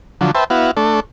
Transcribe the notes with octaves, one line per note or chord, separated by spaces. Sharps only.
D3 F3 F#3
B4 C5 E5 G5 A5
B3 E4 F#4 F5
A3 D4 A4